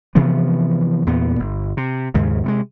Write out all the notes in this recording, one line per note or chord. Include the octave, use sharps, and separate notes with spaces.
C3 E3 F3 B3
E2 A#2 B3
G1
C3
D#2 G#2 C#3
C3 G3 G#3